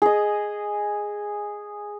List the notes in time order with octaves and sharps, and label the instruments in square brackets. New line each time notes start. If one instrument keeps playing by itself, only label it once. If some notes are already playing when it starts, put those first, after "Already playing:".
[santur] G#4 D#5